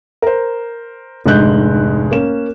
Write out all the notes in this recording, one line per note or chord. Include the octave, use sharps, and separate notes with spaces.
A#4 C5
F1 G#2 D3 G#3 F#6 G6
A#3 C#4 E7